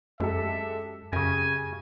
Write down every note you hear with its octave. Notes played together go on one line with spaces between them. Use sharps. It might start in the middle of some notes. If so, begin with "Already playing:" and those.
F#2 G#3 G4 A4 E5
F#2 C#3 G4 G#5 A#6